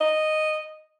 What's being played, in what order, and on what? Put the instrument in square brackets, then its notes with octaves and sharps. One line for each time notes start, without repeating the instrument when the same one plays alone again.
[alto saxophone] D#5